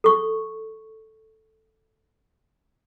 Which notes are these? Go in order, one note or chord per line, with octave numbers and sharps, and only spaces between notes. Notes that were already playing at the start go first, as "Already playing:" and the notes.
A4 C#6